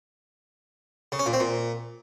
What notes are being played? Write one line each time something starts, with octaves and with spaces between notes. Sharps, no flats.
C#3
C#4
A#2
C4
A#2